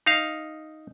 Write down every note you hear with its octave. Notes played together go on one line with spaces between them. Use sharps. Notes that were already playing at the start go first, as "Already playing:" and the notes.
D#4 F5